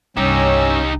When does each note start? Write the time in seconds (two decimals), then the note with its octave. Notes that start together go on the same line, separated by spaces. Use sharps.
0.17 C2 G2 C#4 D#4 G4 E6